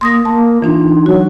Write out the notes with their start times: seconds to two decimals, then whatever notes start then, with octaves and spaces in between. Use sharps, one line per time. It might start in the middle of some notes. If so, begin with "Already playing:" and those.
0.01 A#3 C6 D#6 A#6
0.25 A#3 A5
0.62 E3 D4 D#4 F4
1.06 F#3 F#4